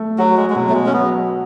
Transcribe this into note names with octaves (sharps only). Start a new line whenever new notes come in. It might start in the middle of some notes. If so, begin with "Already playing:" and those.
Already playing: A3
F#3 F#4
G#3
G#3
B2 F#3
A3
G#3
C#4
F#3 B3